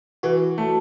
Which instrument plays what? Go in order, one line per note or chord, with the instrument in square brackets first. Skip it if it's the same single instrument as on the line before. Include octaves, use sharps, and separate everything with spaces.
[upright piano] E3 [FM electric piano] F#4
[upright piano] A3